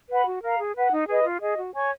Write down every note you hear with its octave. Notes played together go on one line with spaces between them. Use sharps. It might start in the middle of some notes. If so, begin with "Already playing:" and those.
B4 F#5 B5
F#4
A#4 F5 A#5
G#4
B4 F#5
D#4
G#4 B4 D#5
F4
G#4 D#5
F#4
C#5 G#5 C#6